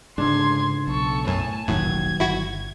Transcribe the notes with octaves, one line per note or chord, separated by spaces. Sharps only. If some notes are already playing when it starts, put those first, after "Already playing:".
C#2 G#2 D3 D4 C6 G#6
B1 A4 C#6
F#2 A2 G#5 A5
E1 A#1 A2 D#3 F#3 G#6
G1 E4 F#4